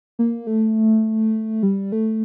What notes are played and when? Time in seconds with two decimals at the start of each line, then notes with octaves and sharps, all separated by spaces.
0.19 A#3
0.47 A3
1.63 G3
1.92 A3